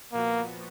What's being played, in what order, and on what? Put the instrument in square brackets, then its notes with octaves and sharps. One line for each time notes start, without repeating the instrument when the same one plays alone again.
[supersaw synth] A#2 F3 B3 F#4 [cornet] A#3